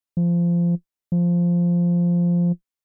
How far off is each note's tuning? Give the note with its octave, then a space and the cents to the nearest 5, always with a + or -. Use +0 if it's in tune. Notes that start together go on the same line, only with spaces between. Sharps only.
F3 -20
F3 -5